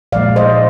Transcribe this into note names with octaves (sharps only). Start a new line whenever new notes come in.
A#2 F3 G#3 D5 F5
C5 D#5